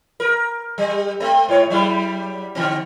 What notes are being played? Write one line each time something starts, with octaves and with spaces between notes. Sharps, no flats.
A#4
G3
A3 C4
G#2 C#5
F#3 G3 E4
D3 D#3 C4